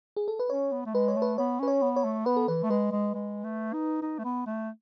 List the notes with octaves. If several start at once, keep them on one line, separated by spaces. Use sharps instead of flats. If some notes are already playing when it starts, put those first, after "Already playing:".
G#4
A4
B4
C#4 C#5
B3
A3
G#3 B4
C#5
A3
B4
B3 C#5
C#4 B4
C#5
B3
C#5
A3
B3 B4
A4
E3 B4
A3
G#3 B4
G#3
G#3
A3
D#4
D#4
A3
B3
A3